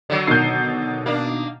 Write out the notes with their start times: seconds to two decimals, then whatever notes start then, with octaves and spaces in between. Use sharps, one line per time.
0.10 D3 F#3
0.28 B2 D#3 G6 C7
1.06 A#3 D4